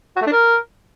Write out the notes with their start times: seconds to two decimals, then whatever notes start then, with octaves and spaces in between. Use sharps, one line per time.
0.16 F#4
0.21 A3
0.27 D4
0.32 A#4